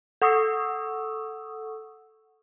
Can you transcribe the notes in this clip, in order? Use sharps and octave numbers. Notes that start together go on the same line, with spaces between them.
A4 F#5 C#6 D#6 E6